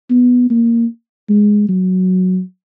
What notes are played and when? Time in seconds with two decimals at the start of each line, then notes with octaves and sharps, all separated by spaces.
0.10 B3
0.50 A#3
1.29 G#3
1.69 F#3